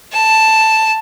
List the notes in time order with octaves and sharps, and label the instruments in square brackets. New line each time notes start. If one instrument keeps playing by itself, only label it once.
[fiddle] A5